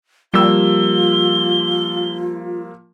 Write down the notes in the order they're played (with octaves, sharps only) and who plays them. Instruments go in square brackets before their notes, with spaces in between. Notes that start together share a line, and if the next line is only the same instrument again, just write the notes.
[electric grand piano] F3 A#3 E6 [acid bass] G3 [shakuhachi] F4 [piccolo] G7